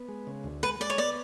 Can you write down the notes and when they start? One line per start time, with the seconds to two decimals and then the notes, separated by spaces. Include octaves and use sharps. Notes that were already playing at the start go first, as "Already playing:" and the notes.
Already playing: B3
0.09 G#3
0.27 C#3
0.44 D2
0.63 G#3 B4
0.80 G#3 D5
0.90 C#5
0.98 B3 D5